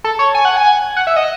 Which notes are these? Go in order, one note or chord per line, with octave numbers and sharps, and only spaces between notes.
A4
C#5
G#5
F#5
G#5
F#5
E5
D#5